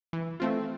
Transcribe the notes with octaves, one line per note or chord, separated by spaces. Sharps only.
E3
A3 C4 F4